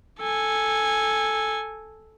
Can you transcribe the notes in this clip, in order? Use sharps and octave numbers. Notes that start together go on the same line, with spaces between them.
A4 G#5